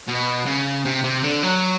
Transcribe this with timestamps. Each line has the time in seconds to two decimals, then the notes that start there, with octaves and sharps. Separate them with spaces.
0.07 B2
0.46 C#3
0.85 C3
1.04 C3
1.23 D3
1.43 F#3